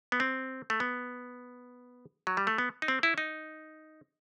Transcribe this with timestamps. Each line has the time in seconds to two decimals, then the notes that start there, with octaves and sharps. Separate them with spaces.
0.12 B3
0.20 C4
0.70 A3
0.80 B3
2.27 F#3
2.37 G3
2.47 A3
2.58 B3
2.82 D#4
2.88 C4
3.03 E4
3.18 D#4